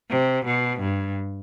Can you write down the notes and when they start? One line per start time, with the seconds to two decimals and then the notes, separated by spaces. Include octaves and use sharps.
0.10 C3
0.45 B2
0.80 G2